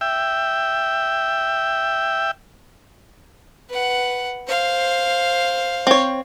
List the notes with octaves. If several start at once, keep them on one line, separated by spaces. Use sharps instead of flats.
E5 G5
B4 F#5
C5 F5
C4 C#5